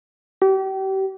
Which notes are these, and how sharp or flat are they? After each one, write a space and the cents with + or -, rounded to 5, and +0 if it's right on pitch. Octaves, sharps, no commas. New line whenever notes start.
G4 -35